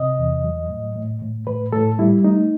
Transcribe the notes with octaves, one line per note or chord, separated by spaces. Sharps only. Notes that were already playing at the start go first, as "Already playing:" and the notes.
Already playing: C3 D#5
E2
F#3
A2
A2
A2
A2 B4
A2 A4
G3 E4
A3 D#4